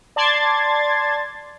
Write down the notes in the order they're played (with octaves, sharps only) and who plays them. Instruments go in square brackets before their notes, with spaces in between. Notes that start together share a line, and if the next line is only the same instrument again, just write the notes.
[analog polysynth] D5 A5 C6 G#6 A6